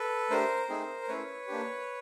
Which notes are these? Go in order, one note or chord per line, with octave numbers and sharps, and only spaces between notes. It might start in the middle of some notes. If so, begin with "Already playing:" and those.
Already playing: A4 B4
A3 D4 G4 A#4 C5
A3 C4 D#4 G#4
A3 C#4 E4 B4 C#5
A#3 D4 G4